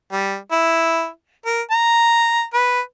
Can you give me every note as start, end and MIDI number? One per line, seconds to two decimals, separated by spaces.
0.12 0.36 55
0.52 1.08 64
1.46 1.61 70
1.71 2.44 82
2.53 2.80 71